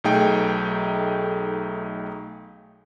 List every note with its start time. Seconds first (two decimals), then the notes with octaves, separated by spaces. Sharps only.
0.04 B1 A3 D#4 G#4 G5